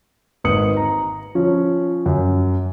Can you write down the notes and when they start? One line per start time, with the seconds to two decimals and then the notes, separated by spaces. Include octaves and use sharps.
0.44 G#1 B4 D#6 C#7 F#7
0.77 A#5
1.35 F3 C#4
2.06 F#2